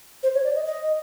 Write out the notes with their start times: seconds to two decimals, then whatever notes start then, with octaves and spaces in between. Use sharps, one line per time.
0.23 C5
0.34 C#5
0.44 D5
0.55 D#5
0.66 D#5